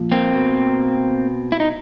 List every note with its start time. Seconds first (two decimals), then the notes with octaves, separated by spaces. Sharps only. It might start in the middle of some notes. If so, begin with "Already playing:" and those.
Already playing: A#2 F3
0.12 A#3 C4
0.35 B2
1.52 E4
1.60 D#4